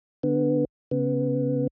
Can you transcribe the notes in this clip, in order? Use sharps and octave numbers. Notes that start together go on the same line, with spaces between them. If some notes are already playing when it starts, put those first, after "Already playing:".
D3 B3
C#3 B3